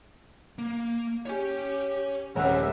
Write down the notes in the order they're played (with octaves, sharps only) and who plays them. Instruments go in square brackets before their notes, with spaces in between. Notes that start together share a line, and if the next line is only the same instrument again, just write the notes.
[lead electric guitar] A#3
[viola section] G4 [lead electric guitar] C#5 G#5
[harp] D#1 A#4 [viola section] G3 E5 [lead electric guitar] G#3 C4 [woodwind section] C#4 F#5